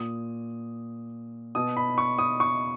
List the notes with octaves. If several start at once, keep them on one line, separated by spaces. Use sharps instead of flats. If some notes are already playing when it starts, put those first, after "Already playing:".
Already playing: A#2 D#6
B2 D#6
B5
C#6
D#6
C#6